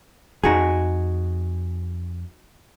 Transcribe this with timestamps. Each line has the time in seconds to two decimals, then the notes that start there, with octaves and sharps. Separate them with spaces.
0.44 F2 D#4 F#4 G#4